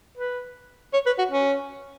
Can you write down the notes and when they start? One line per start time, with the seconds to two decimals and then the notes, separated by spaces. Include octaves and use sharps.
0.18 B4
0.93 C#5
1.06 B4
1.18 F#4
1.31 C#4